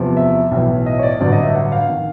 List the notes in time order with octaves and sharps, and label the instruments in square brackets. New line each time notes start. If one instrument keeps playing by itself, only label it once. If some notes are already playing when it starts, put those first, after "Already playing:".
Already playing: [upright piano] E2 C3 F3
E5
B1 A2 E3
D#5
C#5
D5
A1 G2 D3 F#3 D5
D#5
E5
F#5
F5
D#3